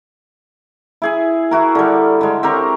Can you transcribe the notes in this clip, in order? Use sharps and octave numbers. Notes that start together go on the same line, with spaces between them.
E4 G#4 G#5
E4 F#4 A#4
D3 G3
D3 G#3
C4 G4 A#4 C#5